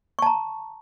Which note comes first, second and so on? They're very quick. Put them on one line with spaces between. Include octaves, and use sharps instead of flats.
C#6 A5 A#5